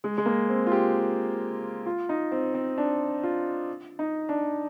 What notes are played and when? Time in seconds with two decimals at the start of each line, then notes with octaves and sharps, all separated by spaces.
0.04 G#3
0.18 G#3
0.26 A#3
0.49 C4
0.67 F4
0.72 G4
1.86 F4
2.09 D#4
2.32 C4
2.54 C4
2.78 D4
3.23 F4
3.99 D#4
4.29 D4